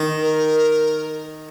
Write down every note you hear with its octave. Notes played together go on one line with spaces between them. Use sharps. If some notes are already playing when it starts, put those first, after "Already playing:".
Already playing: D#3
A#4